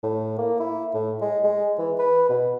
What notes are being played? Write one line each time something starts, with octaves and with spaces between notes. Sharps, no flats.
A2
A#3
E4
A2
G#3
G#3
E3
B4
B2